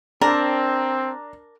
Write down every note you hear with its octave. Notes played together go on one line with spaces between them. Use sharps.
C4 D4 A#4 D5 A5 A#5